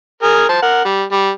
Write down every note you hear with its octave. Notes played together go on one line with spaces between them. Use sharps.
G#4 A#4 G#5
C5 A5
A#4 F#5
G3
G3